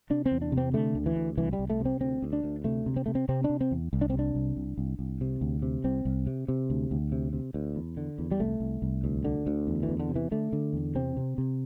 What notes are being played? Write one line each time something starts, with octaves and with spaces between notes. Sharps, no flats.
C3 D4
C4
E2
D4
C3
C4
D3 A3
D2
E3
D2
C2 E3
G3
C2
A3
C3
C4
D2 C4
D2
D4
D2
C3 A3
C3
C4
C3 A3
C4
C3 C4
D4
C3
C4
E2
C2
D4
C4
C3
D4
C2
C2
C2
C2
C3
D2
C3
C2 C4
C2
C3
C3
D2
D2
C3
C3
D2
E2
D3
E2
G3
C2 A3
C2
C2
D2
D3
D2
E2
E3
E2
D3
C3
E3
D3 A3
D3
E2
C3 C4
C3
C3